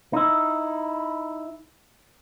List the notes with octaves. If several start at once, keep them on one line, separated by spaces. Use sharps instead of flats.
D#4 E4